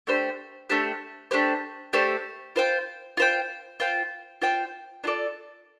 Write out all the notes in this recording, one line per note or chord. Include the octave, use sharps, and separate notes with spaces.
A3 D4 G4 C5
A3 D4 G4 C5
A3 D4 G4 C5
A3 D4 G4 C5
F4 C5 G5
F4 C5 G5
F4 C5 G5
F4 C5 G5
D4 F4 A4 D5